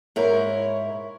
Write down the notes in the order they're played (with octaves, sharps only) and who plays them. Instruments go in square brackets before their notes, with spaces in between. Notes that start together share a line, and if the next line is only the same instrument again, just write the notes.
[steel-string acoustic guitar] G#2 E4 A#4 [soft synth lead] C#5